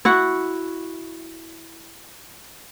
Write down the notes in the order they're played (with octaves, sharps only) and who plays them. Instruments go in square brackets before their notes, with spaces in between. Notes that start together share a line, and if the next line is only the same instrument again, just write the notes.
[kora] E4 F#4 F#5